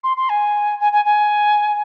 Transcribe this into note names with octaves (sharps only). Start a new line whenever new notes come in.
C6
C6
G#5
G#5
G#5
G#5